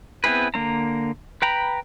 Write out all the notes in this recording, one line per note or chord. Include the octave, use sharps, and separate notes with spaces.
B3 C4 E4 G#4 B4
D3 A#3 C4 A#5
B4 G5 A#5 B5